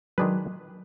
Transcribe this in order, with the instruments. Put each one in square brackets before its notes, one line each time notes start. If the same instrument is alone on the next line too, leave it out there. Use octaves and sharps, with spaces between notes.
[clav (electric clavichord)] D#3 G#3 D4 G#4 B4 [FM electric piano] F#3